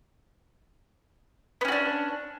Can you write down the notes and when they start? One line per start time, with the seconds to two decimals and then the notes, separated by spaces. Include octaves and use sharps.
1.61 B3
1.65 C#4
1.68 F#4
1.72 D4